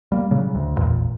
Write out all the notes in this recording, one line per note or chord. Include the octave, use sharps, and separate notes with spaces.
G3 A#3
A2 C#3 F#3 G3
D2
A1 E2 A#2